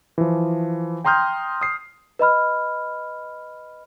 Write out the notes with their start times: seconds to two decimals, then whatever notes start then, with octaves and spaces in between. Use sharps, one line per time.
0.18 E3 F3
1.05 G5 A#5 C6 D#6 F6 G6
1.61 D#6 C7
2.19 B4 D#5 B5 F6